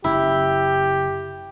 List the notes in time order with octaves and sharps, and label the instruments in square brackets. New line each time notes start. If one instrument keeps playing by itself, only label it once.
[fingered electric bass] F#1 [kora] E4 [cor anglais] G4